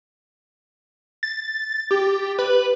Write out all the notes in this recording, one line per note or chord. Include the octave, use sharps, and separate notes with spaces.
A6
G4
B4